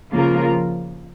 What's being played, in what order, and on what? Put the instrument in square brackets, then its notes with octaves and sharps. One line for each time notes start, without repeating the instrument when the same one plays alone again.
[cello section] C#3 F3 A#3 F4 A#4